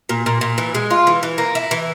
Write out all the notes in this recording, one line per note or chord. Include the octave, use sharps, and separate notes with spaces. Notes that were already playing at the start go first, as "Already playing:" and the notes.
A#2
A#2
A#2
E3
G#3
F4
E3
E3
A#3
E4
E3